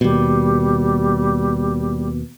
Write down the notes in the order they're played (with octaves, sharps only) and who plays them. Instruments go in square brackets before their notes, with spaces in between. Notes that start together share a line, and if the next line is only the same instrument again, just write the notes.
[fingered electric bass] D#2 B2 [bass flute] G3